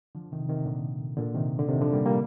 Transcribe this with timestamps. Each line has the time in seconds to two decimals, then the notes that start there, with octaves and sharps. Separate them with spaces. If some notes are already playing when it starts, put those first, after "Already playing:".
0.15 D3 F3
0.32 C3 D#3
0.49 C3 D#3
0.66 A#2 D3
1.17 A#2 D3
1.35 C3 D#3
1.59 D3
1.68 C3 D#3
1.81 D3 F3
1.93 G3 A#3
2.06 G3 A#3